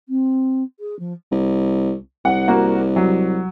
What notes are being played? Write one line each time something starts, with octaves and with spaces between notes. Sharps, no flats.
C4
G#4
F3
C2
C2 F#5
A#3 F#4
F#3